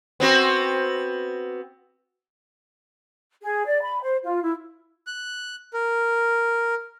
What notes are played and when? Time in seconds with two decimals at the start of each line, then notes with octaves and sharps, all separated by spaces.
0.20 B3 C4 F#4
3.42 G#4
3.66 D5
3.82 B5
4.02 C5
4.24 F4
4.43 E4
5.07 F#6
5.73 A#4